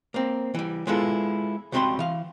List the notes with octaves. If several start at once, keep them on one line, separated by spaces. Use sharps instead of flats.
A#3 C4
E3 G3
G#3 B3 E4 F4 A4
C#2 G3 C4 F#4 B5 C6
E3 F5